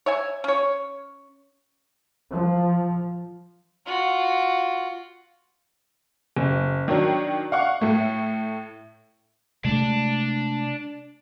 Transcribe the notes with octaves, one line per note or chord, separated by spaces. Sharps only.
C#5 E5 G#5
C#4 C#5
F3
F4 F#4
F#1
D#3 F#3 D4
F5 F#5 C#6
A2 A3
C3 G#3 A3 D4